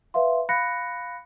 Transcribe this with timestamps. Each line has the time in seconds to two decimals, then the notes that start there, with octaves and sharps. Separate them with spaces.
0.14 B4 E5 F5 C6
0.49 F5 B5 F#6 A#6 C#7